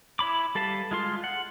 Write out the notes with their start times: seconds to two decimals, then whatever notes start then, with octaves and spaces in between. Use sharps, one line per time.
0.19 E4 C#5 B5 D6
0.55 G3 A4 B4 F5 A5
0.91 G#3 F4 C6
1.24 F#5